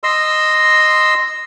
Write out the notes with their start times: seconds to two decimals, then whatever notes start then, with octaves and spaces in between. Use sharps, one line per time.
0.03 D#5 C6 E6